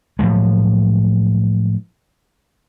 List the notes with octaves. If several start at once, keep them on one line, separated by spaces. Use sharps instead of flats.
A2 F3 F#3 G#3